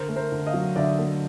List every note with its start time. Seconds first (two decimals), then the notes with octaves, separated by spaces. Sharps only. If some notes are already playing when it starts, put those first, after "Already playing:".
Already playing: D3 A#4 C5
0.09 A3
0.16 A#4 C5
0.32 D3
0.47 D#5 F5
0.54 F#3
0.76 D3 D5 E5
0.99 A3